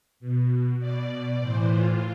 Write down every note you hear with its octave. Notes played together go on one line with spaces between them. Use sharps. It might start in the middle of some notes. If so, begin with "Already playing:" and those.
B2
B2 D5
A2 E3 C5
F4